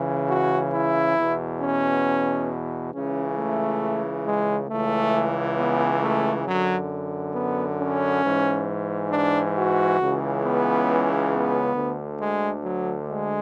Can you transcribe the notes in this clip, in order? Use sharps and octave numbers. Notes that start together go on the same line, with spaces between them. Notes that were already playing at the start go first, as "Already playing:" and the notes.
Already playing: C#2 C#3 E3
F#4
E4
E2 B2
C#4
C#2 C#3 E3 C#4
A3
G#3
C#2 C#3 E3 A3
B3
A3
F#2 D3 F#3
B3
C#4
G#2 E3
D4
F#4
C#2 C#3 E3
B3
B3
D2 D3
G#3
F#3
G#3